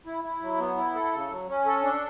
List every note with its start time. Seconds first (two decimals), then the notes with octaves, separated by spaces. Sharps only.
0.06 E4
0.24 E4
0.42 F#3
0.59 B3
0.77 E4
0.95 A4
1.13 C#3
1.31 F#3
1.48 C#4
1.66 A4
1.83 D4